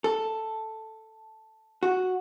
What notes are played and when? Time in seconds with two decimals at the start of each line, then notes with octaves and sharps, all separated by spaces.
0.04 A4
1.83 F#4